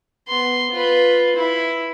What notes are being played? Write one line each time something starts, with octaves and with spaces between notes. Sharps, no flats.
B3 C6
F4 B4
E4